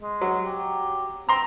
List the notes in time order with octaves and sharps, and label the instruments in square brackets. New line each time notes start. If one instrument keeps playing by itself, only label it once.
[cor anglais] G#3
[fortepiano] F#3
[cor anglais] G4
[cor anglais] C4 [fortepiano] A#5 C6